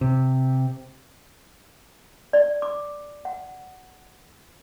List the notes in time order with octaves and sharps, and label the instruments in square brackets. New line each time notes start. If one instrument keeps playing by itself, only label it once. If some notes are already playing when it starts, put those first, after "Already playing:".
[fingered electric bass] C3
[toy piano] D5
D6
F#5